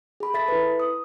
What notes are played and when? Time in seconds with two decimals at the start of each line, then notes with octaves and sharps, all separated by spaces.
0.20 G#4 B5
0.34 A4 E5 A6 B6
0.48 E4 B4
0.80 D#6